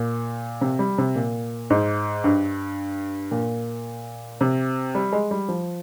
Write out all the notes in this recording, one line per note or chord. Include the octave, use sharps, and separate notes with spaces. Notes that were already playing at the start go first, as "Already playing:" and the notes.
Already playing: A#2
C3
G3
C3
A#2
G#2
G2
A#2
C3
G3
G#3
G3
F3